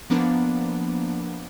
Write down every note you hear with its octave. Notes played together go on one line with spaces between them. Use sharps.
F3 A#3 B3 D4